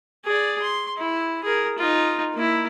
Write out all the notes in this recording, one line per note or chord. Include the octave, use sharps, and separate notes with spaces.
G#4 D5
C6
E4
G#4 A#4
D#4 F4
A#3 E4